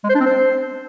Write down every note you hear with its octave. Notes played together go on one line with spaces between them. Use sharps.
G#3
C5
D4
C4
C5